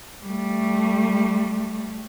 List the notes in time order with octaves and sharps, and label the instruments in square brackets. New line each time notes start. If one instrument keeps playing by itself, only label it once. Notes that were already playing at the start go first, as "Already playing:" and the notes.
[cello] G3 A3